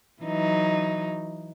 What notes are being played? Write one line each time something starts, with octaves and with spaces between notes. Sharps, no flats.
E3 F#3 D#4